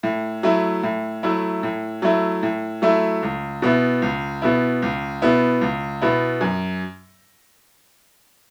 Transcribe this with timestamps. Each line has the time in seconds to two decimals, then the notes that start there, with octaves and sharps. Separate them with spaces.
0.03 A2
0.43 F#3 A3 E4
0.83 A2
1.23 F#3 A3 E4
1.63 A2
2.02 F#3 A3 E4
2.43 A2
2.82 F#3 A3 E4
3.23 C#2
3.62 B2 B3 E4
4.02 C#2
4.42 B2 B3 E4
4.82 C#2
5.22 B2 B3 E4
5.61 C#2
6.01 B2 B3 E4
6.41 F#2